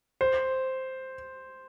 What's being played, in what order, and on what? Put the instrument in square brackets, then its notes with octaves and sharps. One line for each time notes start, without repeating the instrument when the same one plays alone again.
[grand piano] C5